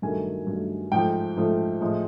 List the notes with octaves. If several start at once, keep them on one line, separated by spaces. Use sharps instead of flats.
G2 D#3 F#3 A3 G#5
G2 D#3 F#3 A3
G#2 F3 A3 G5
G#2 F3 A3
A2 F3 G#3